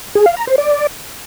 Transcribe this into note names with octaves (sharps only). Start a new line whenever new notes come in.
G#4
F5
A#5
C5
D5